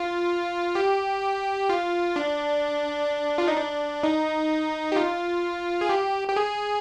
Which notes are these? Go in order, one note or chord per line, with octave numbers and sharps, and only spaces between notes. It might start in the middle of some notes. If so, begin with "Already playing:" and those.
Already playing: F4
G4
F4
D4
F4
D#4
D4
D#4
G4
F4
G#4
G4
G4
G#4